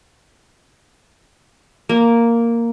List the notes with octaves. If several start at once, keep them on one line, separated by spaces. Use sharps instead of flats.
A#3